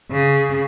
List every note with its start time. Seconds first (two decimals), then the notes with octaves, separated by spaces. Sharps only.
0.11 C#3